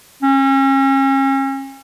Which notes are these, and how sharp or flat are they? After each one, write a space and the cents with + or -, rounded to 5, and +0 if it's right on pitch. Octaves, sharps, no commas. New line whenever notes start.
C#4 -35